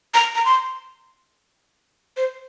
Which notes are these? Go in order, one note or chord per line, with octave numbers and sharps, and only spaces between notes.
A#5
A#5
C6
C5